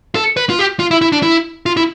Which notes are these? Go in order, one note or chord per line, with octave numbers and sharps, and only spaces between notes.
A4
B4
F4
G4
F4
E4
E4
D4
E4
F4
E4